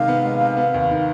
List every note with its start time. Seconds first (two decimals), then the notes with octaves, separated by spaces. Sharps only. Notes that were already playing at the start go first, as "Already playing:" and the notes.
Already playing: C3 D#3 G#3 F5
0.08 B3
0.24 G#3
0.40 C3
0.57 B3
0.74 D#2
0.91 D#3